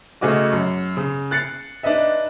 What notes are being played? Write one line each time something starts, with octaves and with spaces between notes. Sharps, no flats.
C#3 A3 C#4 F#4 D#5 D6
F#2
C#3
F#6 A6 C7 C#7
D4 D#4 B4 D#5 E5